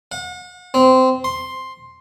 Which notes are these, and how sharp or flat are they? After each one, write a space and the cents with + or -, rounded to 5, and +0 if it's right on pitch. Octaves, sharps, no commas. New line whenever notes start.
F#5 -40
C4 -15
C6 +5